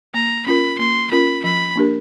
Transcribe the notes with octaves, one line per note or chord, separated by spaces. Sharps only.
A#3 A#5
C#4 F4 A#4 B5
A#3 C6
C#4 F4 A#4 B5
F3 B5
A#3 D4 G4 A#4